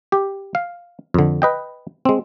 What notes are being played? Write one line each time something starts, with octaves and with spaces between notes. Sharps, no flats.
G4
F5
F2 D3
B4 D#5 G5
G#3 C4